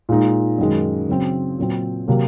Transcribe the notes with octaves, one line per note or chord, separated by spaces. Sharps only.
A#2 G#3 D#4
F#2 D#3 G#3
C#3 F#3 C4
A#2 F#3 C4
C3 F#3 A#3